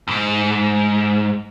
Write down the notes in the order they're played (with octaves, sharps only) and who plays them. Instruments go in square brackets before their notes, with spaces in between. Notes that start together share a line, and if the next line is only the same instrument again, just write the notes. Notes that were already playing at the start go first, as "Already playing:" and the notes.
[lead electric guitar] E2 G#2